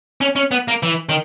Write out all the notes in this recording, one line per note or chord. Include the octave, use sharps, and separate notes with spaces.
C#4
C#4
B3
A#3
E3
D#3